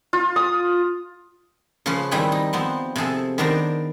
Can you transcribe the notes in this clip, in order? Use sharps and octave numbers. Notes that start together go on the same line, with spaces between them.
F4
D#6
C#3 F3 C#4 B4 C6
D#3 G3 C4 E4 G#4 B4
D#4
F3 B3 C4
C3 F3 G#4 A4
D#3 B3 D4 A#4 C5 D5